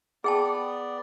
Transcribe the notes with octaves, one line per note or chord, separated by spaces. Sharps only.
B3 G#4 D5 G5 A5